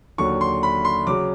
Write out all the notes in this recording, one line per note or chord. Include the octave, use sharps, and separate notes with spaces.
D#2 D3 F#3 C#6
C6
B5
C6
C#3 F#3 D6